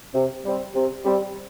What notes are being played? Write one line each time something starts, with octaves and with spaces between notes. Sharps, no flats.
C3
G3 C4
C3
G3 C4